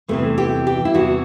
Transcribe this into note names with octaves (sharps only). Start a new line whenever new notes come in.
E2 C3 E3 A3
G4
G4
E4
E2 C3 E3 F#4